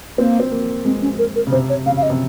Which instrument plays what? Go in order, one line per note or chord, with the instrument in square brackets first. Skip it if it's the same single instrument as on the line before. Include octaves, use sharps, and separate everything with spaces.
[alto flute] A#3 [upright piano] C4
[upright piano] C4
A#3
[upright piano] G#3 [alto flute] C4
[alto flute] C#4
A#4
A#4
[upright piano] C#3
[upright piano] C3 [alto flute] C5
[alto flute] C#5
[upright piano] C#3 [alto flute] F5
[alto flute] F5
D#5
[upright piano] C3